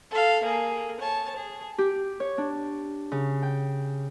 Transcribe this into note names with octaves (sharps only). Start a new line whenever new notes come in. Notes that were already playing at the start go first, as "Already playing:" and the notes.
A4 F5
A#3 G#4
C#5 A5
G#4
G4
C#5
D4
C#3
G5